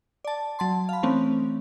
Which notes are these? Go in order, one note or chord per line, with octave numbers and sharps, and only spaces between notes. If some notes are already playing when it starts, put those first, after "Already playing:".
D5 A5
F#3 A5 C6
F5 B5
E3 A3 C4 C#4